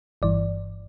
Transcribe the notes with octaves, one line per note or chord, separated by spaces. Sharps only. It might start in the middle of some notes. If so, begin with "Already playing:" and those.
G1 G2 E3 D5